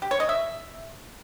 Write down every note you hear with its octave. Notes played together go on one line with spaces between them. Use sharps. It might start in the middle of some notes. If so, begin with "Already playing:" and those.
G4
C#5
D#5
E5